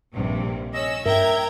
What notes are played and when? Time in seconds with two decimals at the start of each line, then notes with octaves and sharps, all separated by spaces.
0.14 A#1 G2 C3
0.73 C#4 D#5 E6
1.06 G2 A#4 E5 G5 A#5 G#6